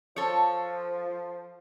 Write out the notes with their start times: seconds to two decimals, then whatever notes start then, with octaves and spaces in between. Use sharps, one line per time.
0.16 F3 A4 C#5